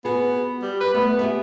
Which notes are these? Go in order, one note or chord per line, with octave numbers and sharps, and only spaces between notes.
B3 F#4 G#4
G3
B4
A3 B3
G4 G#4 E5